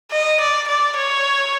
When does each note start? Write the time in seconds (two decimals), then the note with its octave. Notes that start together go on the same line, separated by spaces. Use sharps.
0.12 D#5
0.41 D5
0.68 D5
0.97 C#5